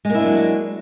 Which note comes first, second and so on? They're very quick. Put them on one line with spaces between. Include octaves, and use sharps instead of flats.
G#3 A#3 E4 D4 F#3